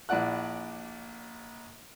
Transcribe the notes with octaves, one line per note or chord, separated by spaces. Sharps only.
A#1 E4 D5 F#5 F#6